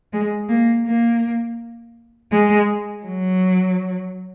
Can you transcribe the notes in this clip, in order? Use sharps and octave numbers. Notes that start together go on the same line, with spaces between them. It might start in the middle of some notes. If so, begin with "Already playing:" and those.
G#3
A#3
A#3
G#3
F#3